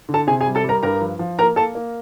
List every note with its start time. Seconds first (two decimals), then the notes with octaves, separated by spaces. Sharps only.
0.09 D3
0.14 A4 A5
0.27 C3 G#4 G#5
0.41 G#4 G#5
0.46 G3
0.55 A4 A5
0.64 G3 A#4 A#5
0.83 G2 A#4 A#5
1.01 F3
1.19 F3
1.39 A#3 A#4 A#5
1.56 A#3 A4 A5
1.75 A#3